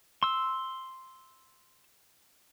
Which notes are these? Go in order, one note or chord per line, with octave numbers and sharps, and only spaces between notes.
C6 E6